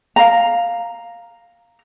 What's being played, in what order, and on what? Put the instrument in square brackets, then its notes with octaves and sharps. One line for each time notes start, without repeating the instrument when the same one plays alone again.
[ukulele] F5 A#5